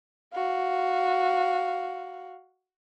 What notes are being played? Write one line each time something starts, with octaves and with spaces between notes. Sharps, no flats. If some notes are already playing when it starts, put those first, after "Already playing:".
F#4 F5